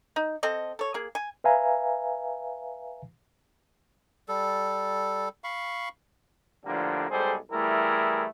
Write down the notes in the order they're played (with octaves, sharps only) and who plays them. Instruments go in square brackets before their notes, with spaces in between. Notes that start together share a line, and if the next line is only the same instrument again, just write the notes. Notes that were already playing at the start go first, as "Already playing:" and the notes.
[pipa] D#4
C4 A4 D#5
A4 C#5
A#3 G#4
G#5
[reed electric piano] B4 E5 F5 G#5 A#5
[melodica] G3 A4
F5 B5 C#6
[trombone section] A2 D3 F3 G3 A#3 D4
B1 G3 G#3 G#4 A4 C5
E3 G3 A3 E4 G#4 A#4